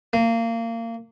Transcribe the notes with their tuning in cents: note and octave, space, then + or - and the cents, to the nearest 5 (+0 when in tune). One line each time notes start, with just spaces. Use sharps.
A#3 -25